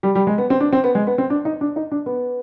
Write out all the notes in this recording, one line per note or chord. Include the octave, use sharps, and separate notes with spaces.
G3
G3
G#3
B3
C4
D4
C4
B3
G#3
B3
C4
D4
D#4
D4
D#4
D4
B3